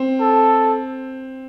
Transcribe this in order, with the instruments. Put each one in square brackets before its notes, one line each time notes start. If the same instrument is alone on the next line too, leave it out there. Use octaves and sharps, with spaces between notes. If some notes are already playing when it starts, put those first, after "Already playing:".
Already playing: [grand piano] C4
[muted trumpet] A4